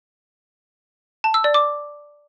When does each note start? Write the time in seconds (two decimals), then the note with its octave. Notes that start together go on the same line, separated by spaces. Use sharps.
1.24 A5
1.34 E6
1.44 D5
1.54 D6